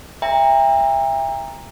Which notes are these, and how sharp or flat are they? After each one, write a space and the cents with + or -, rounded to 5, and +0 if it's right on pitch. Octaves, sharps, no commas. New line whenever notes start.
E5 +10 G5 +40 A#5 +0